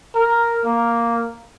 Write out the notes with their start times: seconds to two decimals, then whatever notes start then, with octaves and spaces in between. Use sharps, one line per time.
0.15 A#4
0.65 A#3